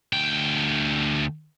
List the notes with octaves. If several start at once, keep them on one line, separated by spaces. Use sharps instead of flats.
D2 G5